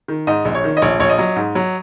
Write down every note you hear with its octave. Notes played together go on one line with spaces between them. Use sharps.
D#3
G#2 D#5
A#1
C#5
D#3
D#5
A#1 C#5
A#1 C#5
D#5
F#3
G#2
F#3